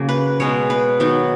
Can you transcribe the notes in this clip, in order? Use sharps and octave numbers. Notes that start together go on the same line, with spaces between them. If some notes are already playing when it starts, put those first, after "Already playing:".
Already playing: C#3 F#3 A#3
B4
B2 G#3 B3 C#5
B4
D#3 F#3 B3